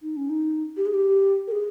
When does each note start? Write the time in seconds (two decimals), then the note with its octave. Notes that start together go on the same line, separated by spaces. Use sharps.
0.03 D#4
0.17 C#4
0.29 D#4
0.77 G4
0.86 G#4
0.94 G4
1.47 A#4
1.52 G#4